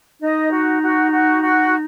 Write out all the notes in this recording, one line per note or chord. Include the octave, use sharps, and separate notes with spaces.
D#4 D#5
F#4
F#4
F#4
F#4